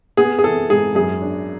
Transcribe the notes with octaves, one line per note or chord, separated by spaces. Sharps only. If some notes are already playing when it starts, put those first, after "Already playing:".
B3 G#4
G#4
E3 A4
G#2 G#4
F#2 G#4
D4